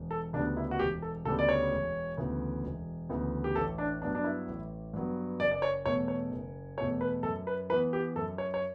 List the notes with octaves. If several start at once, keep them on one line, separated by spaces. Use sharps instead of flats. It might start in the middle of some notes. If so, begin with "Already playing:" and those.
Already playing: E1
A4
D2 C#3 G3 B3 D4
E4
F#4
E1 G4
A4
D2 C#3 G3 B3 A4
D5
C#5
E1
D2 C#3 E3 B3
E1
D2 C#3 E3 B3
G4
A1 A4
D4
G2 F#3 B3 D4
D4
E4
A1
G2 F#3 B3
F#1 D5
D5
C#5
E2 B2 A3 C#5
C#5
F#1
E2 B2 A3 C#5
B4
F#2 A4
B4
E3 B3 B4
G4
F#2 A4
C#5
C#5